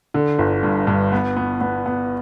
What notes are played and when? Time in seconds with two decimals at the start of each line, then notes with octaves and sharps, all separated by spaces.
0.14 D3
0.39 G1
0.63 G2
0.87 G2
1.12 B3
1.37 B3
1.61 B3
1.86 B3